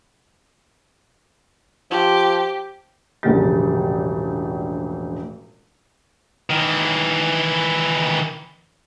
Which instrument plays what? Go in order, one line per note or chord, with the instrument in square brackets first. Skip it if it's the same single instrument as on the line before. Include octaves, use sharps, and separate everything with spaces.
[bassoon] F3 [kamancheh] G4
[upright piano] E1 A#1 A2 C#3 G3 A6
[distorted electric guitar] D#3 E3